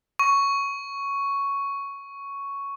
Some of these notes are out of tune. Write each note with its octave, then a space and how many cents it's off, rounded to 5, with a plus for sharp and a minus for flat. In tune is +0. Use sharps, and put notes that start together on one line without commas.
C#6 +5